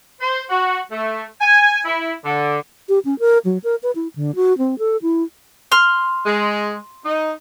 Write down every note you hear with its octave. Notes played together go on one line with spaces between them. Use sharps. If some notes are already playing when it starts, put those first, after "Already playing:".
C5
F#4
A3
G#5
E4
D3
G4
C#4
A#4
F#3
A#4
B4
E4
D3
F#4
C4
A4
E4
C6 F6
G#3
D#4